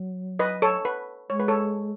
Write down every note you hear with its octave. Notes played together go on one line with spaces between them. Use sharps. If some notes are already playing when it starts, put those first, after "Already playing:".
Already playing: F#3
B4 D#5
A4 C#5
B4
G#3 C#5
B4
A4 C#5